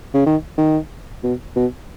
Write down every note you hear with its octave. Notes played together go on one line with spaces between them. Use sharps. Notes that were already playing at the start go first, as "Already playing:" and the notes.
C#3
D#3
D#3
B2
B2